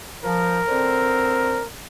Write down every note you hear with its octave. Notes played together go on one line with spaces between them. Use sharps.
F3 A#4
D3 C4 C5